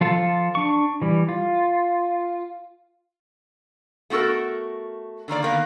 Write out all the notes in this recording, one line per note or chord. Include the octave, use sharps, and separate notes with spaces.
F3 F4 A4
D4 C#6
E3 G3
F4
A3 B3 F#4 A4 A#4
D3 D#3 A#3 D5
D#3 A#3 B3